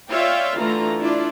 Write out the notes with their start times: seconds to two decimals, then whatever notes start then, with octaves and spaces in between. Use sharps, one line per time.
0.10 F4 C#5 D5 E5 F5 G5
0.57 D3 E3 A3 F4 A#5
1.00 D4 E4 F4 D5